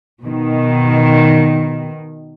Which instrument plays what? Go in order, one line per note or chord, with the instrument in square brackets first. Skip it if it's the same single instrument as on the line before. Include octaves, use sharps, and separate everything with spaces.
[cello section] B2 D#3